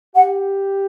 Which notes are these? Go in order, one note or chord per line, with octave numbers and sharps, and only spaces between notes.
G4 F#5